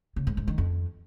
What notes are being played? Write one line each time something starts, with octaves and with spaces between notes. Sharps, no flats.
C#3
G#2
G#2
D#3
F2